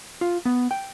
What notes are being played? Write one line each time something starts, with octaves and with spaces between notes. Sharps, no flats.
F4
B3
G5